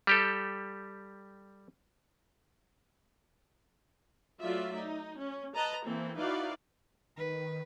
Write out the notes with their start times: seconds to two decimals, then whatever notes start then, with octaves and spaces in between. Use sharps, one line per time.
0.07 G3 G4 A4
4.41 F#3 A3 F4 D5 E5
4.75 D#4
5.19 C#4
5.54 B4 D#5 A5 A#5
5.84 E3 A#3 C4 A4
6.17 D#4 E4 F#4 B4 D5 F5
7.17 D#3 B4